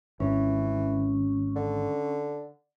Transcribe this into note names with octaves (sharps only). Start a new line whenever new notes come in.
G#1 E3 C#4
D3